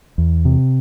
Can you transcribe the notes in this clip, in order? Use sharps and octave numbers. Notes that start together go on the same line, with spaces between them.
E2
C3